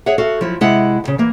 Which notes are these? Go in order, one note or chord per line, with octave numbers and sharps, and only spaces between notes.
G#4 C#5 E5 F#5
F#4 A4 F5
F3 F#3 E4
C3 G#3 E4 F#5
D#2 C#3
E3 A#3